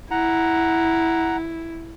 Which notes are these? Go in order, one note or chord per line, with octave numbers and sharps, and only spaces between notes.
E4 F#5 A#5